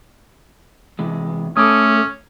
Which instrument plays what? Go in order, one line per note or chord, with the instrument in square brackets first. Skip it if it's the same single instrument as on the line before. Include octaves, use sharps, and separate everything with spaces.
[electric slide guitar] C3 E3 G#3
[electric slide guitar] A3 A4 [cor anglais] C#4 [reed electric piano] D6 D#6